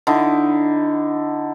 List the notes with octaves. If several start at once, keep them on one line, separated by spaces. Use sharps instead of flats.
D3 D#4 E4